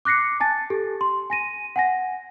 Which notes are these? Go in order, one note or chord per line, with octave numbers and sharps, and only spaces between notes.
D6 F#6 A#6 C7 C#7
G#5 A5 A6
G4 A4
C6
G#5 A#6 D#7
F#5 G#5 A#6